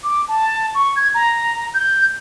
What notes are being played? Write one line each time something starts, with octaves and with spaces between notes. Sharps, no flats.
D6
A5
C#6
G#6
A#5
G6